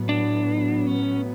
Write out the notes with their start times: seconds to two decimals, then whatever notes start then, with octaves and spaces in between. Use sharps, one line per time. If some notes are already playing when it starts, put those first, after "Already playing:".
Already playing: A2 F#3 B3
0.09 D4
0.87 C#4